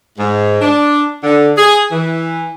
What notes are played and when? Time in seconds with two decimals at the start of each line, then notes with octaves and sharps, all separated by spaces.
0.18 G#2
0.61 D4
1.23 D3
1.57 G#4
1.91 E3